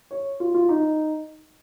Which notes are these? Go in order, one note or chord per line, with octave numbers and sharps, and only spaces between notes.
C#5
F4
F4
D#4